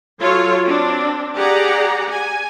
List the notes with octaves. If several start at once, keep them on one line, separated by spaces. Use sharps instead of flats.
F#3 F4 A4 C#5
C4 D4
G4 G#4 D5 F#5 A#5
G#5